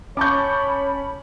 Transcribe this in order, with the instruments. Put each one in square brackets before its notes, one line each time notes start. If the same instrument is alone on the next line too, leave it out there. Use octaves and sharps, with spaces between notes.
[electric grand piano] C#4 A5 C#6 [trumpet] C#5 [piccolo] B5 [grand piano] D6 G6